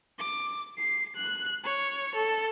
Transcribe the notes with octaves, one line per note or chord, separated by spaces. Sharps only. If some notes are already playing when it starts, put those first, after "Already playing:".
D6
C7
F#6
C#5
A4